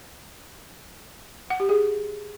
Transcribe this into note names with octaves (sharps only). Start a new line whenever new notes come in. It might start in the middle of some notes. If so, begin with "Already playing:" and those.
F#5
G4
G#4